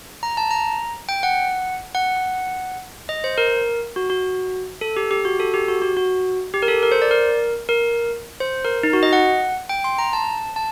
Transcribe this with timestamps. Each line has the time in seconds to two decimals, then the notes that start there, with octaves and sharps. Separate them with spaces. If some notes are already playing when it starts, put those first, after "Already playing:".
0.23 A#5
0.37 A5
0.51 A#5
1.09 G5
1.23 F#5
1.95 F#5
3.09 D#5
3.24 C5
3.38 A#4
3.96 F#4
4.10 F#4
4.81 A4
4.97 G4
5.11 G4
5.25 F#4
5.40 A4
5.54 G4
5.68 F#4
5.82 F#4
5.97 F#4
6.54 G4
6.63 A#4
6.68 A4
6.83 A#4
6.92 C5
7.02 D5
7.11 A#4
7.69 A#4
8.40 C5
8.65 A#4
8.83 D#4
8.93 F#4
9.03 D#5
9.13 F#5
9.69 G5
9.84 C6
9.98 A#5
10.13 A5
10.56 A5